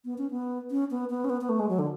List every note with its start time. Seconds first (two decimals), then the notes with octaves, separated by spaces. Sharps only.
0.05 B3
0.18 C#4
0.31 B3
0.71 C#4
0.91 B3
1.10 B3
1.24 C#4
1.29 B3
1.41 B3
1.49 A3
1.59 G#3
1.69 F#3
1.79 D3